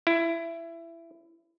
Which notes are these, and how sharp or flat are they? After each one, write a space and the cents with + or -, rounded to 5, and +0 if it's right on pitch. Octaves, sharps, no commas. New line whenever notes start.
E4 +20